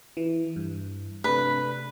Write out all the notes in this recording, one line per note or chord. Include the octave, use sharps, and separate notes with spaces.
E3
G2
C3 A3 D4 B4